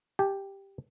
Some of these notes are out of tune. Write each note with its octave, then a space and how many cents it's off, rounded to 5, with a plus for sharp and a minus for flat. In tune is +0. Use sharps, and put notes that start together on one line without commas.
G4 +0 G#5 +45